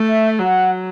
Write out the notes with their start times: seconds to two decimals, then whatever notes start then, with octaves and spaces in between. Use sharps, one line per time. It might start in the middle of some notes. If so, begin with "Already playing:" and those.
Already playing: A3
0.08 E5
0.39 F#3 F#5